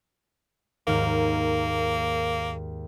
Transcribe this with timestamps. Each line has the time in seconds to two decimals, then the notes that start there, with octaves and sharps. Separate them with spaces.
0.87 D#2 G#2 A#3 F6